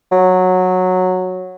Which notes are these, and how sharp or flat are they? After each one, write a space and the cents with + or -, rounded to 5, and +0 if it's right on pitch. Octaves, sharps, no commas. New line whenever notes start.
F#3 -10